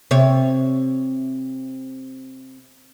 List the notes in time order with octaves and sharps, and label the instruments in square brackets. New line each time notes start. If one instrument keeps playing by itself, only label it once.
[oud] C3 C#5